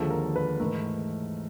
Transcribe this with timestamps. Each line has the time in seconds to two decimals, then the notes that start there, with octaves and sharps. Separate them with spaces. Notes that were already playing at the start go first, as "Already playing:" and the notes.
Already playing: D#2 D3 F3 G#3 A4
0.10 A#4
0.36 B4
0.60 G#2 E3 A3 A#4